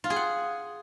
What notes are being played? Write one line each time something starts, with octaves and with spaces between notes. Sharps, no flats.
F4
G#4
F#5